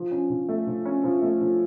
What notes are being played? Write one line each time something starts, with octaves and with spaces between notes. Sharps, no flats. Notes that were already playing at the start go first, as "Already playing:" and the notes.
Already playing: F3
C#4
F3
A3
F3
C#4
F3
A3
F3